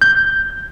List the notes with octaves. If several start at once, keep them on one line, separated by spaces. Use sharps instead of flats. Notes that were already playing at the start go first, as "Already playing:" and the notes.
G6